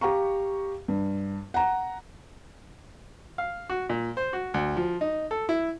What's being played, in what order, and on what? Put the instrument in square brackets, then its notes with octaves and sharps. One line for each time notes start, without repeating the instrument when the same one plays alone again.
[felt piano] G4 F5 A#5 C#6
G2
F#5 A#5
[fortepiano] F5
F#4
A#2
C5
F#4
D2
F3
D#4
A4
E4